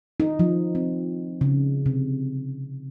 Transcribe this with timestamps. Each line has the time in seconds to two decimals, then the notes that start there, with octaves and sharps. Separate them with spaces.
0.20 D#4
0.39 F3
0.75 C4
1.41 C#3
1.86 C3